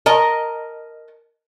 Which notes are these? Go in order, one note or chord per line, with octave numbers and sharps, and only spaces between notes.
A#4 D#5 A5 A#5